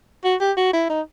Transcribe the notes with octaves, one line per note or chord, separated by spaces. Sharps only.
F#4
G4
F#4
E4
D#4